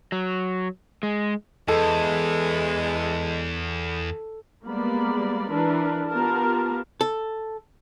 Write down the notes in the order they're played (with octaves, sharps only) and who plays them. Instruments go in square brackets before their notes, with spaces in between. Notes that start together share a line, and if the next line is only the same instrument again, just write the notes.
[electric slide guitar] F#3
G#3
[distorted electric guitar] E2 [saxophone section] E3 G#3 [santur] A4
[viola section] G3 G#3 A#3 B3 D5 B5
E3 D4 A#4 B4
B3 F4 G4 A#4 A5
[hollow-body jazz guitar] A4